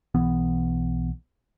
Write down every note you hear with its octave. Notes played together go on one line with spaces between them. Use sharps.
B1 E3 B3